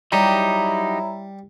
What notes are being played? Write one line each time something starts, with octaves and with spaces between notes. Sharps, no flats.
F#3 G3 D#4 E4 G4 C#5 A#5